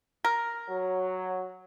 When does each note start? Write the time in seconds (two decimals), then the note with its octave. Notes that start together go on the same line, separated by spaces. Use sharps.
0.25 A#4
0.69 F#3